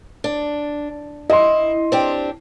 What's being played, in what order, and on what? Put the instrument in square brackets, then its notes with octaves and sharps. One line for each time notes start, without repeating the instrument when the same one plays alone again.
[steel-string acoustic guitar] D4
[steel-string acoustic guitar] E4 [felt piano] D#5 C6
[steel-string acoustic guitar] C4 D4 G4